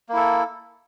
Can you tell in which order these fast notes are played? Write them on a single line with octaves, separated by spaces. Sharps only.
A#3 E4 A4